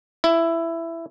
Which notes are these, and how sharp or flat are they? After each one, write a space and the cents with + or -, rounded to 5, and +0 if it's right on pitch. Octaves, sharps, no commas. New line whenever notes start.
E4 +10